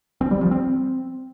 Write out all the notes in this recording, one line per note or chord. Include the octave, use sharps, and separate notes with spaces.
C4
G3
F3
C4